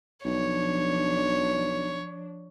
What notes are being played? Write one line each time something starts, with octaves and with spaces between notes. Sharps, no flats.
B1 F3 D4 C#5